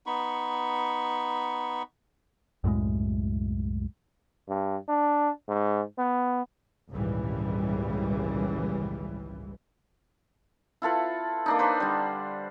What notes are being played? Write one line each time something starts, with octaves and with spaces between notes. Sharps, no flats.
B3 D#4 B5 C#6
C2 F#2 A2 G#3
G2
D4
G#2
B3
G#1 C#2 A#2 C#3 E3 G3
E4 F4 A4 B4
A#3 D4 D#4
B4 C5
D3 G3